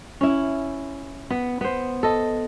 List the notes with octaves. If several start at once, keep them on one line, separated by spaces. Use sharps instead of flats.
C#4 E4
B3
B3 C5
A4 D#5